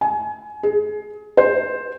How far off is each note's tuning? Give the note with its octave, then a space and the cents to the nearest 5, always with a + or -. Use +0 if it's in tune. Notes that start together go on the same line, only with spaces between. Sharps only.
G#5 +30
G#4 +25
C5 +5